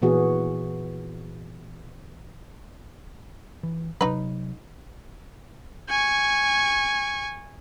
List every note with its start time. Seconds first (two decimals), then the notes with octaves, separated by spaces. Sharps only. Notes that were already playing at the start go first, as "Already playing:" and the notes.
0.02 A#2 E3 B3 F#4 G#4
3.63 E3
4.01 C3 F#3 D#4 B4
5.89 G#5 C#6